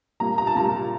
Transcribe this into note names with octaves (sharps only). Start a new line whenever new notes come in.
A#2 G3 A#3 A#5
A#5
A5
A#2 G3 A#3 A#5